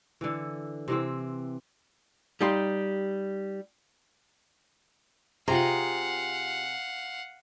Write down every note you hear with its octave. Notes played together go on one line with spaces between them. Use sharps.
D3 E3
C3 E3 C4
G3 D#4 G4 F5 C6
C3 F4 G4 G#4 C5 F5 F#5 A#5